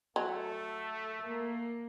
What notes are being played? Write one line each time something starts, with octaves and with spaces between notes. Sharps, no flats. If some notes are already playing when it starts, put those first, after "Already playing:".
F#3 A3 A4
A#3